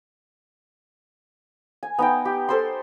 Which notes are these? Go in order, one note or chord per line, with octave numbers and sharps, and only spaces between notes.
G#5
B3 D#4 G5
G4
A4 C5 A5 C6